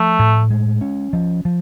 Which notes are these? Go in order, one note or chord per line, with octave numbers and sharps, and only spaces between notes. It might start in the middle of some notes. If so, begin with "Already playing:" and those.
Already playing: F3 A3
A2
G#3
C#4
F3
F3